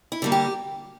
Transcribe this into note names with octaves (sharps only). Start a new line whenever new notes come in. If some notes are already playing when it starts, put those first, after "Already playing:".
E4
D3 G3 A#3
G4